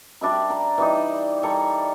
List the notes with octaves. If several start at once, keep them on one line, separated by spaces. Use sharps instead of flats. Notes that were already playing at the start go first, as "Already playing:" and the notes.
G3 D4 E5 B5
A#5
E3 G3 D#4
G3 A4 C#5 A#5